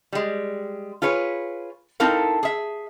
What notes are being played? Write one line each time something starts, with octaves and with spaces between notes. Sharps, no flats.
G3 G#3
F4 G#4 B4 C#5
C4 D#4 E4 A4 A#4 F5
G#4 E5